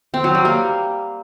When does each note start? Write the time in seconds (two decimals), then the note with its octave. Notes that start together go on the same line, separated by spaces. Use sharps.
0.14 C4
0.24 F#3
0.35 G3
0.45 A#3